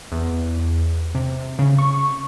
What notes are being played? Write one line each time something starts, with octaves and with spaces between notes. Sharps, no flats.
E2
C3
C#3
C#6